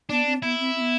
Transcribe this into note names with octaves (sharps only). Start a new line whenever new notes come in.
B3 D4
C4
B3 E4
C4
C4
B3